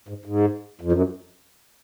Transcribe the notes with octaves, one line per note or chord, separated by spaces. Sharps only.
G#2
G#2
F2
F#2